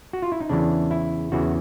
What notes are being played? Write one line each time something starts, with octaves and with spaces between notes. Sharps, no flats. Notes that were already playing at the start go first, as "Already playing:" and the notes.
F#4
F4
E4
D#4
E2 C#3 E3 D4
E4
E2 C#3 E3 F#4